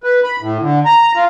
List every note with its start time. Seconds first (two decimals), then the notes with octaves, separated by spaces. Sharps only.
0.04 B4
0.24 B5
0.41 A2
0.61 D3
0.85 A#5
1.16 F4